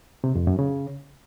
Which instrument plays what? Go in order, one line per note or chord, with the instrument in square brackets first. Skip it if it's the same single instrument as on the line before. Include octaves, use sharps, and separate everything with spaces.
[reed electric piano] C3
F2
F#2
C#3